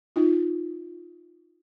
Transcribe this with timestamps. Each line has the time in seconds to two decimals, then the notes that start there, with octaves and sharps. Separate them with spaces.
0.16 D#4 F4